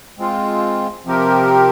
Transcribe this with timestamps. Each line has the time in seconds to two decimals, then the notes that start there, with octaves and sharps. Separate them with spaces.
0.19 G#3 C4 F4
1.06 C3 F3 C4 G4 A#4